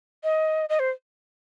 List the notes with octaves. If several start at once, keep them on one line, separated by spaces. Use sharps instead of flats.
D#5
D#5
C5